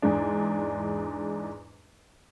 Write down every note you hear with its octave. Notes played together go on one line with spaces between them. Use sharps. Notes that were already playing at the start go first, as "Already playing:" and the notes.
E2 G#2 G#3 D4